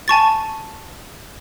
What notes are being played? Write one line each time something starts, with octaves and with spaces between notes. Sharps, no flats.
G#5 A5 C#6 A6